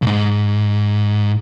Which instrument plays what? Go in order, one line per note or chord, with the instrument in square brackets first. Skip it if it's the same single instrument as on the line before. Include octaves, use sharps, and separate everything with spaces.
[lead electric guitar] B1 G#2